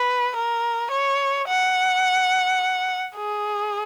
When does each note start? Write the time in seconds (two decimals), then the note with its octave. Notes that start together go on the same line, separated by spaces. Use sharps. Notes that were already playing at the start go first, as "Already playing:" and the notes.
Already playing: B4
0.36 A#4
0.91 C#5
1.48 F#5
3.16 G#4